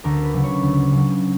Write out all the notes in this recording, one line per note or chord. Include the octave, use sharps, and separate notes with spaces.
D2 A#4
B4
C#3 F#3
C#5
D2
C#3 F#3